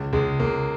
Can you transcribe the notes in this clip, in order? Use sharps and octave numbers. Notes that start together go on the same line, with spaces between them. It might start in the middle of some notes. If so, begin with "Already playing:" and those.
Already playing: C#2
C#2 G#3
C#2 A#3